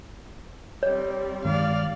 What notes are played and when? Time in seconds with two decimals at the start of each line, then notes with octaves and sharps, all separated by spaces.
0.83 G3 C4 C#5
1.45 G2 D#3 G#3 D5 F5